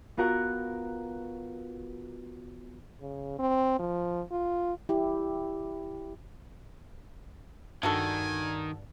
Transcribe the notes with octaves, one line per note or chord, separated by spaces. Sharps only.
B3 F4 F#4 A#4 B4 F#5
C#3
C4
F3
F4
E4 G4
G2 D#3 D4 F#4 A4 G#5